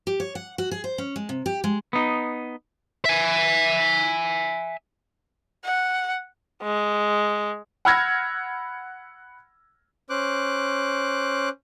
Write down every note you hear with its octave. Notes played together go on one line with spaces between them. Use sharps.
G4
C#5
F#5
F#4
G#4
C5
C#4
G#3
C3
G4
G#3
B3 D#4
E5 G#5
F#5
G#3
F#5 B5 E6 F6 G#6 A#6
C#4 C5 D6 F#6